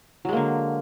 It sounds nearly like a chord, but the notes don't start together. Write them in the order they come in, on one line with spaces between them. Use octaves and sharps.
F#3 G#3 A#3 D3